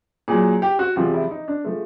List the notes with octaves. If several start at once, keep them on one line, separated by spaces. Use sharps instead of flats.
A#2 F#3 G#4
G4
F#4
E2 C3 F3 G#3 F4
E4
D#4
D4
F3 G#3 A3